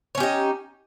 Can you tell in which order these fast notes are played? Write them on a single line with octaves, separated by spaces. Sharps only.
C#5 C#4 G4 D#4